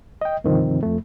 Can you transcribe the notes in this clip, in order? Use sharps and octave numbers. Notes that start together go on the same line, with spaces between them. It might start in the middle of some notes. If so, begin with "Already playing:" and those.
D#5 G5
D2 G2 C3 D#3 F3 C4
F2 A3